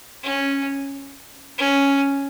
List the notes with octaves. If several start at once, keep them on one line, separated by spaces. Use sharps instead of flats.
C#4
C#4